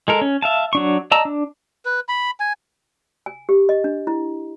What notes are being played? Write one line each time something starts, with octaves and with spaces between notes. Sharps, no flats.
G#3 A4 A#4
C#4
E5 F5 A5
F#3 D4 C#6
D5 D#5 A5 A#5 E6
D4
B4
B5
G#5
G#5
G4
D#5
D4
E4